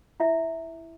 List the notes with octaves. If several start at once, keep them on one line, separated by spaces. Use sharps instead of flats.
E4 E5